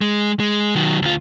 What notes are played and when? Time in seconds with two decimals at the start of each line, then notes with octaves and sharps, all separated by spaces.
0.01 G#3
0.40 G#3
0.75 D#3 F#3
1.02 D2 F4